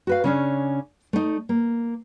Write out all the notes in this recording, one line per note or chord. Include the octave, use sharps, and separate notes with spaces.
F#4 B4 F5
C#3 C#4 D4
A3 D#4
A#3